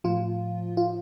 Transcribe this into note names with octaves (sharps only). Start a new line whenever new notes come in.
A2 F3 F4
F4